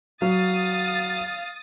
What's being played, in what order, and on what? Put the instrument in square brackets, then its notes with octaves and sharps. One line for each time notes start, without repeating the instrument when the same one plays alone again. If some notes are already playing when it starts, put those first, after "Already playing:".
[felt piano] F#3 [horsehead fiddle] F5 [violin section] D#6 A6